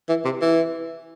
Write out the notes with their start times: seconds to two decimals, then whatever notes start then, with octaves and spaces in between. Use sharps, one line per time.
0.09 E3
0.25 C3
0.41 E3